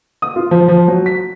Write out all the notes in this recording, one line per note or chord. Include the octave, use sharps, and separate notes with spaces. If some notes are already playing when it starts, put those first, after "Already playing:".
D#6
F4
F3
F3
F#3
B6